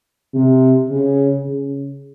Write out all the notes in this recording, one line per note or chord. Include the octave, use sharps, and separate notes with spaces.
C3
C#3
C#3